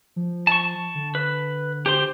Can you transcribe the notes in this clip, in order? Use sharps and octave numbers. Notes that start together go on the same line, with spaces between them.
F3
A5 C#6
D3
B4
G4 C5 C6